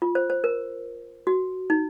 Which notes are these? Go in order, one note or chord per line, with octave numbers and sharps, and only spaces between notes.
F4
C5
C5
A#4
F#4
D#4